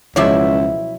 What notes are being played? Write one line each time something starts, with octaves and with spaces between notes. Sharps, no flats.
C#2 B2 F3 F#3 E4 C#5 E5 D6